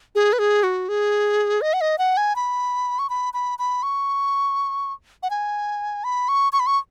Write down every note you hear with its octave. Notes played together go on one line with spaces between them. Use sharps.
G#4
B4
G#4
F#4
G#4
D#5
F#5
D#5
F#5
G#5
B5
C#6
B5
B5
B5
C#6
F#5
G#5
B5
C#6
C#6
B5
C#6